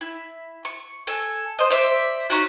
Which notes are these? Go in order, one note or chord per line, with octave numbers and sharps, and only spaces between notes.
E4
C#6
A4 G#5
C5 D#5
C5 D5 E5
C#4 D#4 F#4